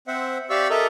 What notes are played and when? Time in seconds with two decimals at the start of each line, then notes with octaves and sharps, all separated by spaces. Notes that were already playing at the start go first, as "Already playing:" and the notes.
0.08 C4 C5 E5 F#5
0.50 G4 D5 E5 F5 C#6 E6
0.70 A4 A#4 D#5 E5 A#5